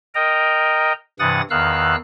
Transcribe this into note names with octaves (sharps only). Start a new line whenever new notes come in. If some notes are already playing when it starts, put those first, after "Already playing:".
A#4 D#5 G5 A#5
G2 C3 E3 F#5 D#6 A6
E2 D#3 F5 E6 F#6